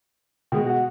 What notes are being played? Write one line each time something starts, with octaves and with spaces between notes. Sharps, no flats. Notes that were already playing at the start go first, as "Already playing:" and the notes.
B2 G#3 G5
F#4 F#5